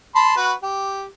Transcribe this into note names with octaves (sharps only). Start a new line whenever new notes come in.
A5 B5 C6
F#4 B4
G4